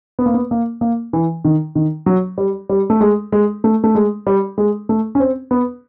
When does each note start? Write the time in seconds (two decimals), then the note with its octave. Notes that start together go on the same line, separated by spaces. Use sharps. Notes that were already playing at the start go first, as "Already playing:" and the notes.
0.19 B3
0.26 A#3
0.34 B3
0.51 A#3
0.81 A#3
1.13 E3
1.45 D#3
1.75 D#3
2.06 F#3
2.38 G3
2.69 G3
2.90 A3
3.01 G#3
3.32 G#3
3.64 A3
3.84 A3
3.95 G#3
4.27 G3
4.58 G#3
4.89 A3
5.15 C#4
5.20 C4
5.51 B3